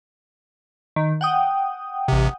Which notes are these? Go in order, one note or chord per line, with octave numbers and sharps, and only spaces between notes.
D#3
F#5 G5 D#6
A1 C3